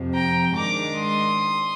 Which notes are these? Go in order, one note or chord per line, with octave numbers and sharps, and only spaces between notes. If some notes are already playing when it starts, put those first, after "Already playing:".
Already playing: F2 C3 F3
G5 A#5
G#2 D#3 G#3 D4 A#5 D6
C6 D#6